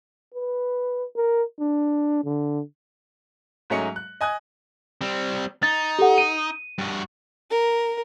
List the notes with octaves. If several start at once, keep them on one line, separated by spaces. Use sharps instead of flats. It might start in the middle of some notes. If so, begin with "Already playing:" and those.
B4
A#4
D4
D3
G#2 F#3 A3 C#4 D#5 C#7
F#6
D#5 G#5 D#6 F#6 G#6
G3 C4
D#4 A6
G4 A4 F#5
D#7
G2 F#4
A#4